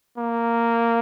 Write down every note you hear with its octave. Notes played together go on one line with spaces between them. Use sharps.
A#3